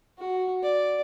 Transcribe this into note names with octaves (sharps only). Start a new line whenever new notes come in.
F#4
D5